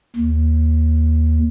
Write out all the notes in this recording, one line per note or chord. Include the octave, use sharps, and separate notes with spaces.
D#2